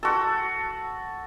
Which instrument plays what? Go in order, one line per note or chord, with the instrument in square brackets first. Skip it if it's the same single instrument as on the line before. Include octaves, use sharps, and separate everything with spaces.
[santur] F#4 A4